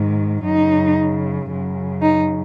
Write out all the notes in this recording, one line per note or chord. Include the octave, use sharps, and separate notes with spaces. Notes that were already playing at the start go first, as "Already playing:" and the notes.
Already playing: G#2 D#3
F#2 C#3 D#4
F#2 C#3
D#4